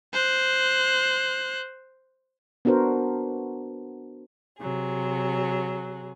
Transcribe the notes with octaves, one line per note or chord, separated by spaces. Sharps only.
C5 F#6
B3 D4 F#4 A#4 C5
C3 F#3 G#4